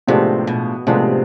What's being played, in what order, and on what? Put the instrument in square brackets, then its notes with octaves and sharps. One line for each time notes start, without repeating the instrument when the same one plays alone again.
[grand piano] A2 F3 G#3 B3 D4 [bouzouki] C3
[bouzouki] B2
[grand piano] A2 F3 G#3 B3 D4 [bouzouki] C3